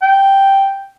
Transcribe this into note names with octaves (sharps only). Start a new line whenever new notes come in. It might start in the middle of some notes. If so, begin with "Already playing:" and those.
G5